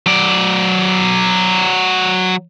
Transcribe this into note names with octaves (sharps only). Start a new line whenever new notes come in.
F#3 D5